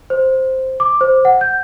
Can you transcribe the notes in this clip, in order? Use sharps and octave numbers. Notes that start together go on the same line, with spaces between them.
C5
D6
C5
F#5
G6